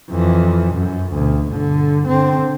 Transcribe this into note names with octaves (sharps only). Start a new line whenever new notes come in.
F2 E3
F#2
D2 B2
G1 D3
D3 C4